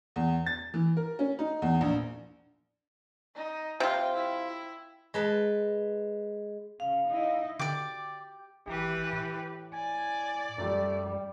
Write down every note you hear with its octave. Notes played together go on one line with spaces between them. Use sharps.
E2
A6
E3
A#4
C#4
D#4
E2
A#1
D#4
C3 F4 G5
E4
G#3 B4 A5
C#3 F5
D#4 E4 D#5
D3 G4 D5 D6
G#1 E3 G4 B4
A2
D5 G#5
F#2 G3 A3